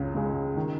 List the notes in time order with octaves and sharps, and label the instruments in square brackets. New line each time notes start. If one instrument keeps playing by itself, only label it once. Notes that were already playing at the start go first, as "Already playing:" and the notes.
Already playing: [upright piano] C#2 C#3
C#3 G#3
D#3